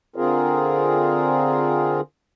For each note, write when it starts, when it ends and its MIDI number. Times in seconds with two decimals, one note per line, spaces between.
0.16 2.01 50
0.16 2.01 60
0.16 2.01 65
0.16 2.01 68
0.16 2.01 70